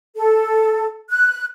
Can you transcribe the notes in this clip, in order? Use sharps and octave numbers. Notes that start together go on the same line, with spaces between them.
A4
F#6